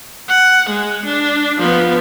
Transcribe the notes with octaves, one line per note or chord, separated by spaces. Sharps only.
F#5
G#3
D4
F3 B3